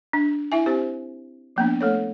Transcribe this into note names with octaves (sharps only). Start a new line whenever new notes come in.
D4
E4 E5 G#5
C4 G4 C5
F3 A#3 B3 D4
A3 A4 C#5